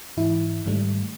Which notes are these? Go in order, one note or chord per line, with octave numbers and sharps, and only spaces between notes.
G#2 E3 E4
G#2 D#3 G3 A3